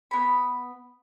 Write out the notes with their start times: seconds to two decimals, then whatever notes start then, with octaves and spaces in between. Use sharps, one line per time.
0.11 B3 B5